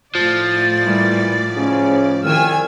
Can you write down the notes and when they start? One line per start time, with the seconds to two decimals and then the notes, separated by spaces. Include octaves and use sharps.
0.15 A2 F3 D5 A6
0.86 A#2 E3 G3
1.57 G#2 C#3 C#4
2.24 C2 D#3 G#5 E6 F6